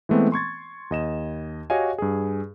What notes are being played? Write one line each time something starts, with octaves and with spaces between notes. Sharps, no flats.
E3 G#3 A3 B3 C4
C6 C#6 G#6 A6
D#2 D#5 E7
F#4 G4 C#5 D#5 F5 G#5
G2 G#4